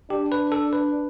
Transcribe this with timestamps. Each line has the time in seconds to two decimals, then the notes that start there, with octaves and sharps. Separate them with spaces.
0.10 D4 G4
0.32 B4
0.52 A4
0.73 B4